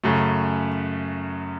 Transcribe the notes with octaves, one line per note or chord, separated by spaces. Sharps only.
F#2 C#3 F#3 A3